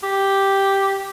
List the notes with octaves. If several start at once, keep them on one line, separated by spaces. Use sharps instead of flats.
G4